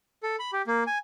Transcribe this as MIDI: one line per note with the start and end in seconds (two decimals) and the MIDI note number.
0.23 0.36 69
0.39 0.51 83
0.53 0.62 67
0.67 0.84 58
0.87 0.98 80